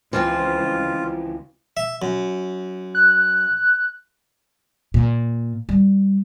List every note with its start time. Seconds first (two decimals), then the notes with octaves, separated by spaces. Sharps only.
0.13 C#2 E3 F3 C4 F4
1.77 E5
2.02 F#2
2.95 F#6
4.94 A#2
5.69 G3